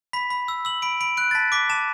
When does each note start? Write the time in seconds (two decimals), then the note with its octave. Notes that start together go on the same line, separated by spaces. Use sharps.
0.13 B5 B6
0.30 B5
0.48 E6
0.65 E6 F#7
0.82 B5 D7
1.01 B5 D7
1.17 F#6 D7
1.31 A6
1.35 A5 B6
1.52 D6 B6
1.70 A5 E7